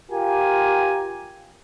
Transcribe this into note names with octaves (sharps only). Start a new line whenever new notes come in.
F4 G4 A#4 G#5